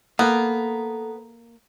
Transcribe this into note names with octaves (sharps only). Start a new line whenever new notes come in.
A#3 B3 A4 A#5